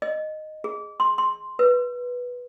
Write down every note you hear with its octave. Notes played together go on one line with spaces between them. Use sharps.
D#5
G#4
C6
C6
B4